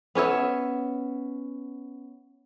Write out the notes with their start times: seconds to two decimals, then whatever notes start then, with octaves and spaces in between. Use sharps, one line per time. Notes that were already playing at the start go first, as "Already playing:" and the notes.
0.15 B3 C#4 C#5 E5